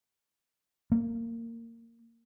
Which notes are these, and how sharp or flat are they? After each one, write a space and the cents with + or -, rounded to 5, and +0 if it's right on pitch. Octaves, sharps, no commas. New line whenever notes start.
A#3 -20